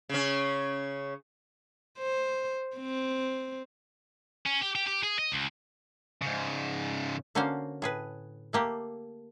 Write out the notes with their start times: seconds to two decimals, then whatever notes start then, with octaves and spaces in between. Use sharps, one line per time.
0.09 C#3 C#4
1.98 C5
2.77 C4
4.46 C#4
4.62 G4
4.75 G4
4.87 G4
5.03 G#4
5.19 D#5
5.32 C#2
6.22 G#2 C#3
7.35 D3 A#3 C#4 F#4 C5 F5
7.82 A2 G#4 B4
8.53 A3 A#3 G4